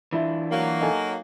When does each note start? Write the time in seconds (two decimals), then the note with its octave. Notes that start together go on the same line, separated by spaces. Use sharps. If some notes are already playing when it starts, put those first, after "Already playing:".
0.13 E3 D4 E4 F4
0.51 F#3 A#3
0.81 D#4 A4 G#5